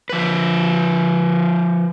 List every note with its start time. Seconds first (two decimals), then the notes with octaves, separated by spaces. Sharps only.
0.09 F3 B4